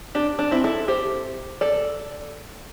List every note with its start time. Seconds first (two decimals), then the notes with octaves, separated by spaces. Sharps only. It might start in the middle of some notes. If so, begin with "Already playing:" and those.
0.15 D4 G4
0.39 D4
0.51 C4 E4
0.64 E4 A4
0.88 G4 C5
1.61 A4 D5